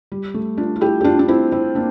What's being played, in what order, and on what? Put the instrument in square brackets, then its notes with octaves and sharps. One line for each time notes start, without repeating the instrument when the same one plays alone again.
[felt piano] G3
A3
D4 F4
F4
E4 G4
G4
D4 F4
D4
C4 E4
C4 E4
A#3 D4